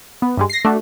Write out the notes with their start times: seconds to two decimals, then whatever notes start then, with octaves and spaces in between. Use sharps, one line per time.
0.22 B3
0.37 G2 G3 G#3
0.50 A#6 C7
0.65 A3 D4 F#4